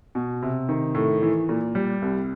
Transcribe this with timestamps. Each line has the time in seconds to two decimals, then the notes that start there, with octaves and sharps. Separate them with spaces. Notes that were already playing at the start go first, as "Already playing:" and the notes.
0.15 B2
0.42 C3
0.69 D#3
0.95 A2
1.22 E3
1.49 A#2
1.75 G3
2.02 C2